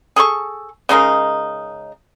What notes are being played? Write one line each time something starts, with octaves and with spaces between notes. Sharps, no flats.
G#4 A4 G#5 C#6
C#3 G#3 D#4 A#4